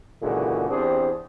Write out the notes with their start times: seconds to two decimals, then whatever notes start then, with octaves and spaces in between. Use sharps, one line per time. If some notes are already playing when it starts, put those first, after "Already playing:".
0.21 C#2 A#2 D3 E3 F#4 G#4
0.70 E2 C4 D4 G4 G#4 C5